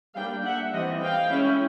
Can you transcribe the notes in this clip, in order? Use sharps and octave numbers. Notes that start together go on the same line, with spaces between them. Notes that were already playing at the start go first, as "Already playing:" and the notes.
G3 A#3 D4 F5 G5
E5 F#5
E3 G3 C4 D#5 F5
F5 G5
G#3 C#4 E4